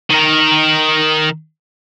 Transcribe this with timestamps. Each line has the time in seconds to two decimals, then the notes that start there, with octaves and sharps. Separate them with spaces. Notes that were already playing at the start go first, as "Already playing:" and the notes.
0.10 D#3 A#4